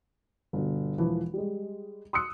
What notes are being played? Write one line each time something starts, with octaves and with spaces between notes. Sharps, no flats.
G1 B2
E1 E3 F3
G3 G#3
C6 D#6 E6 F#6 C#7